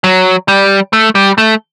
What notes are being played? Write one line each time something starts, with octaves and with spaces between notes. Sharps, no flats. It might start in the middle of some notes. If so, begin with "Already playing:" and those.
F#3
G3
A3
G3
A3